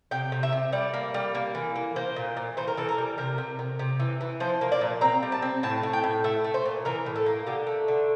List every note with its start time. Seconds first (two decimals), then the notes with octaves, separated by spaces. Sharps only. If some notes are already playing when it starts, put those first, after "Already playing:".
0.11 C3 G5
0.32 C3
0.43 E5
0.52 C3
0.72 G3 D5
0.94 A#3
1.14 G3
1.35 A#3
1.55 E3
1.76 A#3
1.96 A#3 C5
2.16 A#2
2.37 A#2
2.57 E3 C5
2.68 A#4
2.77 E3 A4
2.89 A#4
2.98 G3
3.18 C3 A#4
3.38 C3
3.59 C3
3.79 C3
4.00 E3
4.21 E3
4.40 F3 C5
4.61 A#3
4.72 D5
4.81 A#2
5.01 C4 A#5
5.23 G3
5.32 A5
5.42 C4
5.63 A2 A5
5.83 A2
5.93 G5
6.04 A2
6.24 A3 E5
6.44 A3
6.54 C5
6.66 A#2
6.85 E3 A#4
7.06 A2
7.16 A4
7.26 A#3
7.46 D3 G4
7.67 A3
7.88 D3